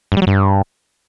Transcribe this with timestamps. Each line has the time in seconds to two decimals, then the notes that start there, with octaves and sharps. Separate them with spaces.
0.12 G2
0.17 G3
0.22 F#3
0.27 G2